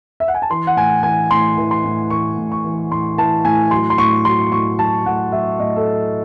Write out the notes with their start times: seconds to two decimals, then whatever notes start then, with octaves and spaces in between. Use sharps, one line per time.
0.20 E5
0.28 F#5
0.34 G#5
0.42 A5
0.50 E3 C6
0.67 F#5
0.76 A2 G#5
1.03 E3 G#5
1.31 A2 C6
1.57 E3
1.71 C6
1.85 A2
2.10 E3 C#6
2.38 A2
2.52 C#6
2.64 E3
2.91 A2 C6
3.18 E3 A5
3.45 A2 G#5
3.71 F#3 C6
3.90 C6
3.98 A2 C#6
4.25 F#3 C6
4.51 A2 C#6
4.79 F#3 A5
5.06 A2 F#5
5.32 F#3 E5
5.59 A2 D#5
5.76 A4